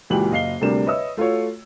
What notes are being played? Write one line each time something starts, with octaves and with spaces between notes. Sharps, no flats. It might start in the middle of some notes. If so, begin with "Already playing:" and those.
C#2 A#2 E3 F#4 G4 F#7
F#1 D#5 F5 C7 G7
D2 C3 G3 D4 A#4 E7
B4 C#5 D#5 E5 D#6 E6
A3 F4 F#4 C#5